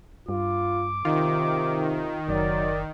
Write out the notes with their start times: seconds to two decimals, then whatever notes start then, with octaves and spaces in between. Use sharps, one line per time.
0.29 G2 F4 D6
1.05 C3 D#3 F4
2.28 F#1 F#3 D5